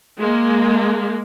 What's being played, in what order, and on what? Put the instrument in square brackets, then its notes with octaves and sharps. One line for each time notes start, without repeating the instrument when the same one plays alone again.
[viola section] G#3 A#3